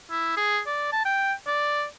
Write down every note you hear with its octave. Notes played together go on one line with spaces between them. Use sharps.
E4
G#4
D5
A5
G5
D5